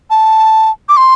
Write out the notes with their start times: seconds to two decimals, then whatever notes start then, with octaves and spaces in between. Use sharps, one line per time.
0.10 A5
0.89 D6
0.97 C6